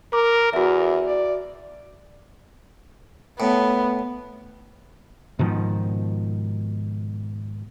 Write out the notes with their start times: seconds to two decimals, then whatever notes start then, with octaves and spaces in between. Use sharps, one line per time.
0.13 A#4 D6
0.53 E2 F#4 E5
1.06 D5
3.40 A2 B3
5.39 G#2 B2 D#3 F3